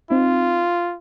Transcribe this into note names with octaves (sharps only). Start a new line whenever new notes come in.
C4 D#4 F4